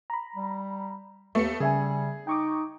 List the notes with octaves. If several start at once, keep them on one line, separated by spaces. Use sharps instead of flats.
A#5 B5
G3
D#2 A3 B3 C#6 C#7
C#3 G3 G#4 E5 G#5
D#4 G5 C#6 D6